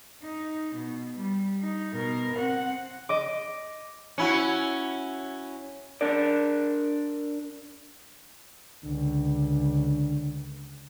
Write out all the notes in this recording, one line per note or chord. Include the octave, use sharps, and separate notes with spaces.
D#4
B2
G3
D#4
B2 A#4
C4 F#5
D#5 D6
C#4 E4 F#4
D4 A#4 D5
C#2 D3